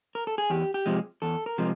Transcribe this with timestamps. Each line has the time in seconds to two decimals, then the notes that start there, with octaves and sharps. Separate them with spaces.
0.15 A#4
0.27 A4
0.38 G#4
0.50 E2 G4
0.74 G4
0.86 C3 F3 G#3
1.22 E2 A4
1.46 A#4
1.58 C3 F3 G#3